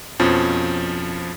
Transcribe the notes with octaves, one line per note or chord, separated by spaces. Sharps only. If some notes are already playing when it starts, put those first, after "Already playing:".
F2 B2 F3 C#4